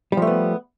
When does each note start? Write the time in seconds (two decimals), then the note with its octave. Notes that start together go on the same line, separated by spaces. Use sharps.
0.12 G3
0.17 F3
0.22 A3
0.27 B3